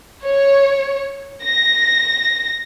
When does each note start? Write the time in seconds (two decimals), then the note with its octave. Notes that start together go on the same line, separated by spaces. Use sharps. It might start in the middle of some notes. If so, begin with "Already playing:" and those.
0.24 C#5
1.44 A#6